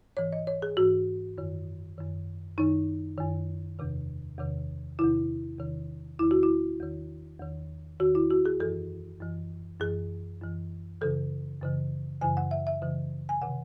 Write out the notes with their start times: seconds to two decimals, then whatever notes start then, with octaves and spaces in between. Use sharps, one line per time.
0.17 G#2 E3 C#5
0.33 D#5
0.47 C#5
0.62 G#4
0.77 G#2 E3 F#4
1.38 F#2 D#3
1.98 F#2 D#3
2.58 F#2 D#3 D#4
3.18 F#2 D#3
3.79 E2 C3 D#3
4.38 E2 C3 D#3
4.99 E2 C3 D#3 E4
5.59 E2 C3 D#3
6.19 E2 D#3 E4
6.31 F#4
6.43 E4
6.80 E2 D#3
7.40 E2 D#3
8.00 E2 D#3 F#4
8.15 E4
8.31 F#4
8.45 G#4
8.60 F#2 E3 A4
9.20 F#2 E3
9.80 F#2 E3 G#4
10.42 F#2 E3
11.01 F#2 C#3 E3 A4
11.61 F#2 C#3 E3
12.21 F#2 C#3 E3 G#5
12.37 F#5
12.51 E5
12.67 E5
12.82 F#2 C#3 E3
13.29 G#5
13.42 C3 D#3 F#5